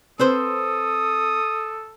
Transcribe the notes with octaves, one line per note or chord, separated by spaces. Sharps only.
C4 A4 B4 C5 D#6